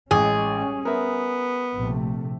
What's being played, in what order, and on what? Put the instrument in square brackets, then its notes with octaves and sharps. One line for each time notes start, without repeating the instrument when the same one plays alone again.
[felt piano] A1 G#3 [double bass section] G3 C#4 [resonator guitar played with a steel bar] G#4
[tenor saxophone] B3 [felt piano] A#4 E5
[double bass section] A#1 C3 A3